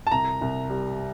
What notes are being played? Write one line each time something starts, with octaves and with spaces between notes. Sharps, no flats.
A5
C2 A#5
C2
G3